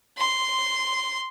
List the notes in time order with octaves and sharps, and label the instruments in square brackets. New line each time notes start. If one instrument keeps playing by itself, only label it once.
[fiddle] C6